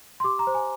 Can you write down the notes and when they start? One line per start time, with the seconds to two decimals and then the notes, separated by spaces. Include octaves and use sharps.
0.20 C6
0.24 G4 D6
0.39 A#5
0.47 C5
0.54 G#5